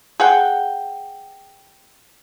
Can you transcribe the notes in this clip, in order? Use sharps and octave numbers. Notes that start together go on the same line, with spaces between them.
G#4 F#5 G5